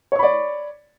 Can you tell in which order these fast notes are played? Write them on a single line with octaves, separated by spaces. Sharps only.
C#5 C#6 B5 D5